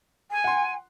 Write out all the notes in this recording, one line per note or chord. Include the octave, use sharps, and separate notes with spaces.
G#5
F#5 C6